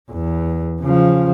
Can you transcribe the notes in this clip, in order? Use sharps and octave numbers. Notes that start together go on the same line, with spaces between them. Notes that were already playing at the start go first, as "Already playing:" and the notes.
E2
C#3 F3